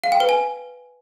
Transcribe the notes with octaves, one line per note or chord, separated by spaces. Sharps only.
F5
G5
B4
G#5